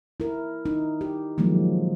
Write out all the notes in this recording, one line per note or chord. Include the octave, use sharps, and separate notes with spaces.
E4 A#4
D#4
G4
D#3 F3 F#3 G#3 A#3